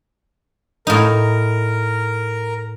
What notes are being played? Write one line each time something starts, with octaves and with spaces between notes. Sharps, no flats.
A2 D#4 A#4